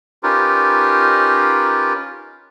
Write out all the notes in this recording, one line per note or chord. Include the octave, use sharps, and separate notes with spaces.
C#4 D#4 F4 G4 A#4 B4